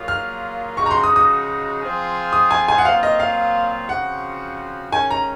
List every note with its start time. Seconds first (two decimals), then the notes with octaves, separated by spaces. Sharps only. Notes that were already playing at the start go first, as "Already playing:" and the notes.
Already playing: A#2 F#3 A#3 F4 G#4
0.08 F6
0.77 C#3 F3 G#3 D#4 F#4 C#6
0.86 A#5
0.91 C6
1.04 D#6
1.16 D#6
1.81 F3 C4 F4 G#4
2.33 D#6
2.51 G#5
2.68 G#5
2.78 F#5
2.85 A#2 F#3 C4 F4 F5
3.03 D#5
3.20 F5
3.88 C#3 F3 C4 F#4 F#5
4.92 G#2 D#3 G#3 C#4 G#5
5.11 A#5